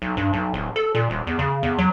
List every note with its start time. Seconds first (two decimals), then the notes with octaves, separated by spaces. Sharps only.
0.02 B1
0.17 G2
0.33 B1
0.54 D1
0.76 A4
0.95 A#2
1.10 D#1
1.27 E2
1.39 C#3
1.63 E2
1.78 F#3